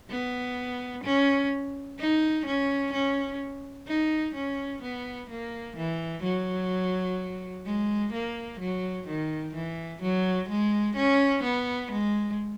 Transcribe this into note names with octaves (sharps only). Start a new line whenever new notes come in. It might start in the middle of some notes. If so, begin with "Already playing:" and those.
B3
C#4
D#4
C#4
C#4
D#4
C#4
B3
A#3
E3
F#3
G#3
A#3
F#3
D#3
E3
F#3
G#3
C#4
B3
G#3